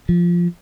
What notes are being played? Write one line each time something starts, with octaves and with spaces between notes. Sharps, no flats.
F3